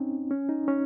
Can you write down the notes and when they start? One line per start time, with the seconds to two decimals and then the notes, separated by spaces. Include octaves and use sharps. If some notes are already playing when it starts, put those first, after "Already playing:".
Already playing: C4 C#4 D#4
0.31 C#4
0.49 D#4
0.68 C#4